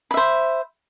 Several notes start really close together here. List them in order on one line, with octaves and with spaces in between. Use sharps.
B5 E5 C5